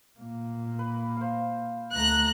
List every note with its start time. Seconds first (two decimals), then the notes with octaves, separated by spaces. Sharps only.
0.19 A#2 A#3
0.79 B4
1.17 C5 F5
1.94 D2 A3 A#5 F#6